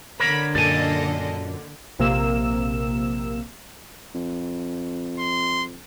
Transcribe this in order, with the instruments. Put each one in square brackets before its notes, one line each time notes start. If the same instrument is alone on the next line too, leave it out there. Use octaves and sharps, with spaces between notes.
[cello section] D3 [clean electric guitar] A#4 C#5 [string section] B5
[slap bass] F#2 A#2 [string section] A#3 A4 D#5 [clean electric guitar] D5 G#5
[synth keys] A#1 C3 A#3 E6 E7
[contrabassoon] F2
[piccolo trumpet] C6